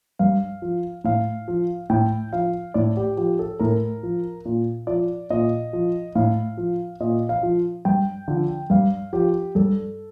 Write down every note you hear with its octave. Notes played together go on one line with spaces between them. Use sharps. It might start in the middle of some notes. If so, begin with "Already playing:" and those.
G2 F5
F3
A2 F5
F3
A2 G5
F3 F5
A2 D5
G4
F3 G4
A4
A2 A#4
F3
A#2
F3 D5
A#2 D#5
F3
A2 F5
F3
A#2 D#5
F5
F3
G2 G5
D3 F3
G2 F5
F3 G4
G2 A4